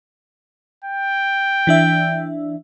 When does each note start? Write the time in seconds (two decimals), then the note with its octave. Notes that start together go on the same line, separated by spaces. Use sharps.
0.85 G5
1.67 E3 D4 E5